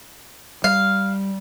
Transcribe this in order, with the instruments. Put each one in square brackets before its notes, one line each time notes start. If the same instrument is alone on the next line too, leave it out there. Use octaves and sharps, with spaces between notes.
[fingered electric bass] G3 [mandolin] F5